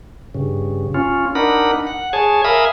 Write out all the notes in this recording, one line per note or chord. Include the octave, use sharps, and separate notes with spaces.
G2 C#3
C#4 F4
D4 D#4 A#4 F#5 B5
F#5
G#4 C#5 G#5 A5
A#4 E5 F5 G#5 B5 D#6